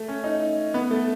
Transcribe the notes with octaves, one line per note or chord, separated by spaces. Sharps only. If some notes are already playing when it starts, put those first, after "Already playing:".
Already playing: A3
C#4
D#4
B3
A3